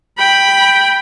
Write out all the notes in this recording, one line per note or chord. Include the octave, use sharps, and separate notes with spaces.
G5 B5